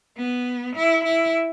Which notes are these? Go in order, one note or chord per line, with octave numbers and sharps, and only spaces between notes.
B3
E4
E4